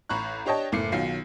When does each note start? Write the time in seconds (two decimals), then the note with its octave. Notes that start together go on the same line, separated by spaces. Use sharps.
0.09 A1 A#5 B5 C#6 F#6
0.46 D4 G4 C#5 D#5 G5 A5
0.72 F#1 A2 D6 C7 C#7
0.92 B1 D#3 F#3 F4 C7